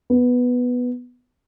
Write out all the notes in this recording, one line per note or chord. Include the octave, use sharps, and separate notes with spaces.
B3